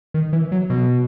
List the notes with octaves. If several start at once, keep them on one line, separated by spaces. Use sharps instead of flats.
D#3
E3
F#3
B2